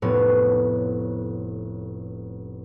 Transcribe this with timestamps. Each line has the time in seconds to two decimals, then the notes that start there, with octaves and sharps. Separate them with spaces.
0.02 F1 A2 B3 C#5